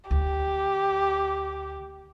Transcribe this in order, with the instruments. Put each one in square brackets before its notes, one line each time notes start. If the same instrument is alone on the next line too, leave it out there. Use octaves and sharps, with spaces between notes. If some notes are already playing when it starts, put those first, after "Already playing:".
[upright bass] D2 [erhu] G4